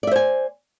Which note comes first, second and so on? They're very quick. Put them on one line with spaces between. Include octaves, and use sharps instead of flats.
D5 E5 C5 G#5